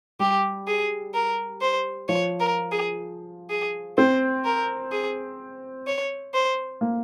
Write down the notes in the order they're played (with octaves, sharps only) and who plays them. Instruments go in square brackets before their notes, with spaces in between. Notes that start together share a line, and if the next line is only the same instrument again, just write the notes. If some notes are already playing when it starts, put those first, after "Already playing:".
[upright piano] G3 [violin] G4
[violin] G#4
A#4
C5
[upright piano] F3 [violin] C#5
[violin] A#4
G#4
G#4
[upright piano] C4 [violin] C5
[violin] A#4
G#4
C#5
C5
[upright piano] A#3